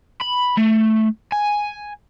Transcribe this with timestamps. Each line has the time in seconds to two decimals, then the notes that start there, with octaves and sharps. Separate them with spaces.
0.22 B5
0.58 A3
1.32 G#5